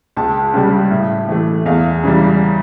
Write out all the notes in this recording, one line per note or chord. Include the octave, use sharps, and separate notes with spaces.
C#2 A5
C#3 G3
A2
E3 A3
E2 F5
C#3 E3 G3